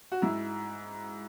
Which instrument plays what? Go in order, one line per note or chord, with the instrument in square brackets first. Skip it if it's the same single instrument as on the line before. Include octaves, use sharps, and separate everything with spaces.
[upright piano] F#4
G#2 E4